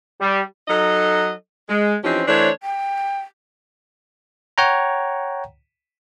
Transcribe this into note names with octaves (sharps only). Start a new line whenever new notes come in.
G3
F#3 D#4 A4 D#5
G#3
E3 F3 C4 C#4 D#4 G4
E3 A3 D4 C5 C#5
G5
C#5 F#5 G5 A#5